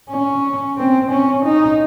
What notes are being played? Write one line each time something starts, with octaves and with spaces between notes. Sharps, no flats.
C#4
C4
C#4
D#4